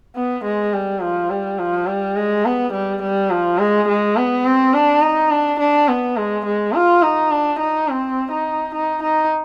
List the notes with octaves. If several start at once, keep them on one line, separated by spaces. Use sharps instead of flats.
B3
G#3
G3
F3
G3
F3
G3
G#3
B3
G3
G3
F3
G#3
G#3
B3
C4
D4
D#4
D4
D4
B3
G#3
G#3
F4
D#4
D4
D#4
C4
D#4
D#4
D#4